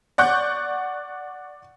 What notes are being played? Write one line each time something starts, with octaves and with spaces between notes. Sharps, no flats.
D5 F#5 C#6 F#6 G6